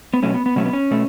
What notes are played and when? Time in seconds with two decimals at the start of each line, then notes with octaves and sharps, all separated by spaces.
0.14 B3
0.23 B2 F#3 A3 C#4
0.34 B3
0.46 B3
0.56 B2 F#3 A3 C#4
0.65 B3
0.73 C#4
0.91 B2 A3